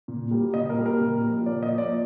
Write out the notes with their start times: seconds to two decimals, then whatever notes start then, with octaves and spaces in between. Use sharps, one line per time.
0.08 A#2
0.31 G3 A#3
0.54 A#2 D#5
0.70 A#4
0.78 G3 A#3
0.86 A#4
1.00 A#2
1.24 F3 A#3
1.46 A#2 D5
1.63 D#5
1.70 F3 A#3
1.78 D5